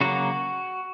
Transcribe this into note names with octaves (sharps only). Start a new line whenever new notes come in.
C#3 F#3 A#3 F#4